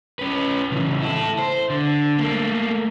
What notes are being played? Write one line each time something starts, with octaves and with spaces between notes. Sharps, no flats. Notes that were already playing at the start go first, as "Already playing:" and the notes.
C#4 B4
C#3 E3
E4 A4
C5
D3
A3 A#3